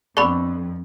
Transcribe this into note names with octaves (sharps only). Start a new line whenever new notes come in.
F2 B3 D4 E5 B5 C#6